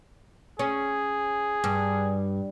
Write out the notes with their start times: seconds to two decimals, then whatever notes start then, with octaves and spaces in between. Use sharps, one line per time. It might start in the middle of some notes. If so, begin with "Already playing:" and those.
0.59 C#4 G#4
1.64 G2